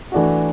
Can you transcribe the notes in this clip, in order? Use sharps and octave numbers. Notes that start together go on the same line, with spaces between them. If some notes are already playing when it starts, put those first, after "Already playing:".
E3 A3 D4 F#4